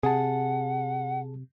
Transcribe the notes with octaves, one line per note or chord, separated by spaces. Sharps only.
C3 G#4 F#5 A5